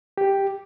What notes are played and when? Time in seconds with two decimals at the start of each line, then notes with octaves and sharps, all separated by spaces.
0.18 G4